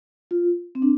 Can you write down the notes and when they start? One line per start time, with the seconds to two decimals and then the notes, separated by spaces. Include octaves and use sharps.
0.31 F4
0.75 C4
0.82 D4